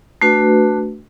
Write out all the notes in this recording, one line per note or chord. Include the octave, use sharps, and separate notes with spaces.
A3 D4 F#4 B4